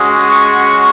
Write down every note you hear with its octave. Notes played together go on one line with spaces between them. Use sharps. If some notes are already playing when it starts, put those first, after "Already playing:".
Already playing: G#3 C#4 F#4 D#6
C#6